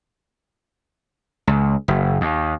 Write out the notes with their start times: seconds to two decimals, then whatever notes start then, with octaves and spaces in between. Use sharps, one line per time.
1.47 C#2
1.88 F#1
2.21 D#2